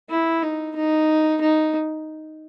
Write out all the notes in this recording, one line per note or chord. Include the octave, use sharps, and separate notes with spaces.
E4
D#4
D#4
D#4